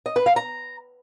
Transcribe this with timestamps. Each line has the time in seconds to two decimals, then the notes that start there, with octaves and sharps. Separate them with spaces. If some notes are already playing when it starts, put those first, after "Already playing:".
0.06 D#5
0.16 B4
0.26 F5
0.36 A#5